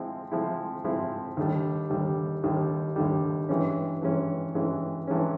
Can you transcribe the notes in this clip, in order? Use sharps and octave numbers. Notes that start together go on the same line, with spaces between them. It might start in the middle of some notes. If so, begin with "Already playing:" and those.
Already playing: F3 G#3 C4 E4
F3 G#3 C4 E4
F3 G#3 C4 E4
D#2 D3 G3
D#2 D3 G3
D#2 D3 G3
D#2 D3 G3
G2 E3 G#3 C#4
G2 E3 G#3 C#4
G2 E3 G#3 C#4
G2 E3 G#3 C#4